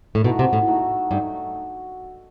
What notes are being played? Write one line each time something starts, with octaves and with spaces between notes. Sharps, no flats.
A2
B2 A3 D#4 F#4 A4
C3
A2
A3 D#4 F#4 A4
G2 F#3 A3 D#4